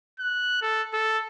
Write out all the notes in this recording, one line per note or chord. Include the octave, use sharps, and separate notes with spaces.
F#6
A4
A4